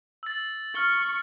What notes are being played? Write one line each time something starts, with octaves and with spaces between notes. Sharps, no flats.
E6 A6
C#6 F6 G7